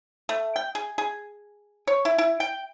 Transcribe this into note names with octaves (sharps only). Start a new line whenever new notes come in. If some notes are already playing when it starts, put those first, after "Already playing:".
A3
G5
G#4
G#4
C#5
E4
E4
G5